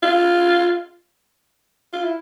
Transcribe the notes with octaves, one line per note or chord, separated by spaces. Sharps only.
F4
F4
E4